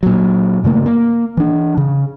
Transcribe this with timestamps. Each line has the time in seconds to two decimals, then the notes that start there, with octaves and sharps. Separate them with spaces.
0.03 A#2 F#3
0.64 G2 C#3 A3 A#3
0.86 A#3
1.37 E3 D4
1.77 C#3